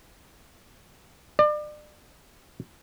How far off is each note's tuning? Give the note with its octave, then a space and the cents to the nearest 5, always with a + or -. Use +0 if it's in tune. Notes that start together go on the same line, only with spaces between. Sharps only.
D5 +35